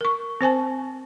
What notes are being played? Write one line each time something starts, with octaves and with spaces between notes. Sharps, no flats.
A#4 C#6
C4 C5 G#5 A5